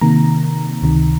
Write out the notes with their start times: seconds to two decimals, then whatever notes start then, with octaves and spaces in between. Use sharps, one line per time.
0.01 C3 D#3 A#3 A#5
0.82 C#2 C3 D#3